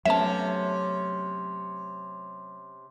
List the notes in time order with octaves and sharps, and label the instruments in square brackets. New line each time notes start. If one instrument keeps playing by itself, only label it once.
[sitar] C3 C#4 [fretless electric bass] F#3 A3 B3 [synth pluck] E5 A5